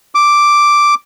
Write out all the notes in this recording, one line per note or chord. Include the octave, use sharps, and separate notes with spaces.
D6